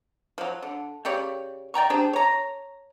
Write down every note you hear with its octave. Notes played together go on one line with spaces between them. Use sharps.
F3 F#3
D3
C#3 G4 C#5 D5
D5 G5 A#5 C#6
D4 G4 G#4 C5
C#5 A#5